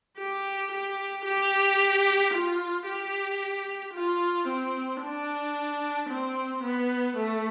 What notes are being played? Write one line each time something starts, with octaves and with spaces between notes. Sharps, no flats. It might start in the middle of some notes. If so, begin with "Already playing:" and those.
G4
G4
G4
F4
G4
F4
C4
D4
C4
B3
A3